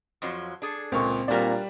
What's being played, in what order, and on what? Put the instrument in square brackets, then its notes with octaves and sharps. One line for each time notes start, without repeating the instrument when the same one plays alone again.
[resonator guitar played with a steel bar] F2 F3 F#3
D4 G#4 A4
[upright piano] C#2 A#2 C#6 [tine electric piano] C4
[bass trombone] A#2 [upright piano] G3 D5 [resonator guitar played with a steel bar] D4 F#4 A#4